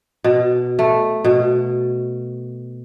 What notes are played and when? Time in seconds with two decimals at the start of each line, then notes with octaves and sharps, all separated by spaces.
0.24 B2
0.79 A3
1.24 B2